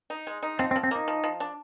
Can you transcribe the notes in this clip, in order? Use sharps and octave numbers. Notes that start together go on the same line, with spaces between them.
D#4
G#3
D#4
F3 C4
C4
F3
C4
A#3 D#4
F3
F3
D4